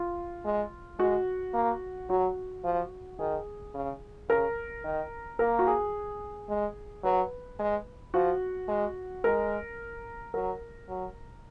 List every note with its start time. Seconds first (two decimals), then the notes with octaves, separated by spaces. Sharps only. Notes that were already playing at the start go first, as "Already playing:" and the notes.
Already playing: F4
0.45 G#3
0.99 G#3 F#4
1.54 A#3
2.09 F#3 F#4
2.64 F3
3.19 D#3 G#4
3.75 C#3
4.29 C#3 A#4
4.84 D#3
5.39 A#3 A#4
5.59 F#4
5.67 G#4
6.49 G#3
7.04 F#3 B4
7.59 G#3
8.14 F3 F#4
8.69 G#3
9.24 G#3 A#4
10.34 F#3 A#4
10.89 F#3